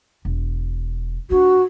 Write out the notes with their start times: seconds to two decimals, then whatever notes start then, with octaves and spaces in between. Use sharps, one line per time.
0.25 E1
1.30 G#2 D4 F#4